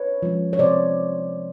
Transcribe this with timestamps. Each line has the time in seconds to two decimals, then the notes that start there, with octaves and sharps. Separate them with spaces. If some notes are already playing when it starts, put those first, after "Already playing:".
Already playing: B4 C#5
0.22 F3 G#3 C#4
0.53 C#5
0.59 C3 C5 D5